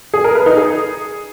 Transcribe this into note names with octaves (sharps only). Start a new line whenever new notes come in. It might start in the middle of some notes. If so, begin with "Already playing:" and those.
G#4
A#4
B4
D#4
G#4